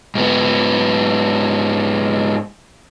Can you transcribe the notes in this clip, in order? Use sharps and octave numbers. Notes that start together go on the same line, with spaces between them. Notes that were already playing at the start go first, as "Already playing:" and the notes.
G#2 B3